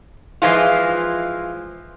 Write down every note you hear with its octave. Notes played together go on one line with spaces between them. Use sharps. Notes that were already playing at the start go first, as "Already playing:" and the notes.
E3 F3 G#3 F4